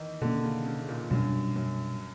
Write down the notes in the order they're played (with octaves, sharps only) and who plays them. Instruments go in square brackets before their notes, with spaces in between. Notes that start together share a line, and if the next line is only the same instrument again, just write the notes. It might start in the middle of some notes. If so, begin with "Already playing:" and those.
Already playing: [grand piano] D#3 E3
[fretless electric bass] B2 G3 A#3 C#4 [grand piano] D3
[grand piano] C#3
C#3
A#2
[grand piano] F#2 [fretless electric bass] B2 G3 B3 D4
[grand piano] F#2